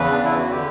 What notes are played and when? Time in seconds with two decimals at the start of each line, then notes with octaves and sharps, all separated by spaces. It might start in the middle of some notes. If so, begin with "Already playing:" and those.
Already playing: E2 C#3 E3 B4
0.11 D4
0.25 E4
0.37 F#4
0.51 D3 G4